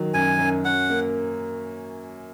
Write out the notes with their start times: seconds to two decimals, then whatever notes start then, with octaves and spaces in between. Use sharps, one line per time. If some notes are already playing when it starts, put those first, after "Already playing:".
Already playing: D#3 F#3
0.14 F#2 G#5
0.39 F#2
0.65 C#4 F#5
0.90 A#3